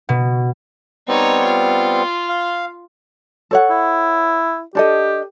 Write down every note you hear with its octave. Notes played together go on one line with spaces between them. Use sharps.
B2
G3 B3 C4 D#4 C#5
F4
F5
A4 C#5 F#5
E4
D4 G4 A4 D#5